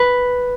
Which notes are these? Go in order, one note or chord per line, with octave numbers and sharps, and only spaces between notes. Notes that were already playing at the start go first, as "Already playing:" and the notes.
Already playing: B4